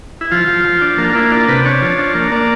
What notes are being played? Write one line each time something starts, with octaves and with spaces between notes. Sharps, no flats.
E4
F3 F4
F3
F3
D4
A#3 F4
F4
A#3 E4
D4 F4
C3 B4
D4 C#5
F3
D4
A#3
A#3 D5